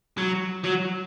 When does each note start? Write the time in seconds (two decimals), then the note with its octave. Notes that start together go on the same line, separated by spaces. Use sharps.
0.18 F#3
0.64 F#3